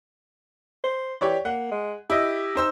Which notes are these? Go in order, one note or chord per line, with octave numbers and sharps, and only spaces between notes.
C5
E3 G4 C#5 D5
A#3 F#5
G#3
E4 G4 D#5
D#4 C5 E6